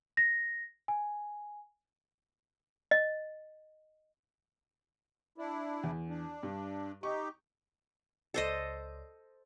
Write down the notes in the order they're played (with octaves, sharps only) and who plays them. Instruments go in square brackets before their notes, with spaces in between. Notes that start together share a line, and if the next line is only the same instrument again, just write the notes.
[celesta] A#6
G#5
[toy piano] D#5
[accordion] D4 E4
[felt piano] E2
[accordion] D4
[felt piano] G2
[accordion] D#4 G4 [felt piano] C#6
[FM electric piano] C#2 D5 [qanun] A4 C5 D#5